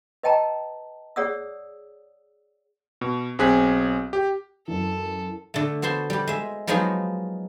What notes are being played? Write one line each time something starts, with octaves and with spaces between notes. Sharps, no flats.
B4 D#5 G5 A5 A#5
G#4 C#5 D5 F#5 D#6 E6
B2
B1 C4 G#4 F#6 B6
G4
F#2 E3 A4
D3 A3
B3 F#4 C5 A5 C6
G3 G4
G#3 E5
F3 F#3 G#3 B3 D#4 F#4